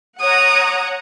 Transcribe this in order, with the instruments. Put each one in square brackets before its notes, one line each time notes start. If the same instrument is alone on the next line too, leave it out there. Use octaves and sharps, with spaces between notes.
[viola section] C#5 F#5 A#5 [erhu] D#6